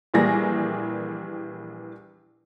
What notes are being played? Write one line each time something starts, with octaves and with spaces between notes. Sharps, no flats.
A#1 E3 G3 A#3 G#4 A#6